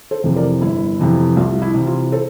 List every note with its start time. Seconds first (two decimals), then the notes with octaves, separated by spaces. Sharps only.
0.11 A4 C5
0.24 F2 C3 E3
0.36 A#4 D5
0.61 G1 E4
0.99 F2 C3 E3
1.37 C2 F4
1.62 E4
1.75 C3 E3
1.87 F4
2.12 A4 C5